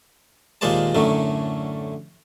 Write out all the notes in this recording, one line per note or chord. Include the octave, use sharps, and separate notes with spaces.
D#2 A#2 G#3 C5 D5 A5
F#2 A2 D3 F#3 A3